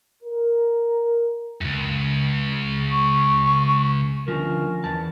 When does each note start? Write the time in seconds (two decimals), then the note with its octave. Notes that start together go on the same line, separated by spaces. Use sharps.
0.23 A#4
1.61 C#2 F#2
2.91 C#6
4.28 D2 G2 F3 C#4 A#4
4.84 E2 A5